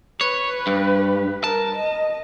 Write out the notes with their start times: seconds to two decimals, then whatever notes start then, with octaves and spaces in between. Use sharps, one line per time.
0.21 B4 C#5
0.67 G2
1.44 A#4 A5
1.76 D#5